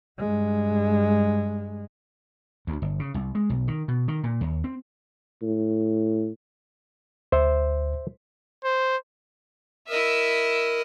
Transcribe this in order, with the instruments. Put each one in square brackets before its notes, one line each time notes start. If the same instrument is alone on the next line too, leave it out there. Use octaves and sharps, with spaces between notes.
[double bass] G2 G#3
[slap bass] D2
G1
C#3
C2
G#3
B1
D#3
B2
D#3
A#2
D#2
C4
[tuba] A2
[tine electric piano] D2 [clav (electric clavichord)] C5 E5
[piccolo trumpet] C5
[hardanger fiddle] E4 D#5 [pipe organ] A#4 [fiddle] E5